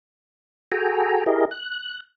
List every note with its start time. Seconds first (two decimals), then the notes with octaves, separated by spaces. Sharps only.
0.72 F#4 G#4 A4 G5 G#5 A#5
1.26 E4 G4 G#4 A#4 D#5
1.51 F#6